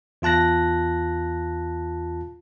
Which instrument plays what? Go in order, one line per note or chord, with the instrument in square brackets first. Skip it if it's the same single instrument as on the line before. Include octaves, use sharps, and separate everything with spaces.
[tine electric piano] E2 F4 A5 F#6 A#6